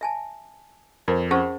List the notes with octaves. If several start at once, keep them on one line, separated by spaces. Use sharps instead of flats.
E5 G#5 A5
F2 A#4 C5
C#4 G#4 C5 F#5 C#6